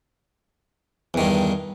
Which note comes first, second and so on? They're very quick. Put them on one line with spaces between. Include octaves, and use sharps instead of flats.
E2 D#3 G2